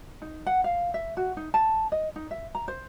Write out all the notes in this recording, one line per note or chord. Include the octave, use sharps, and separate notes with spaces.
D#4
F#5
F5
E5
F#4
D#4
A5
D#5
D#4
E5
A#5
C5